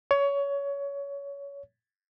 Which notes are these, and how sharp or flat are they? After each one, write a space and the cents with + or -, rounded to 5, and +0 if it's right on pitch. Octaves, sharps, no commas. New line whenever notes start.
C#5 +20